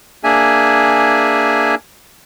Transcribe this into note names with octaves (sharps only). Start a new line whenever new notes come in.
A#3 D4 G#4 E5 G#5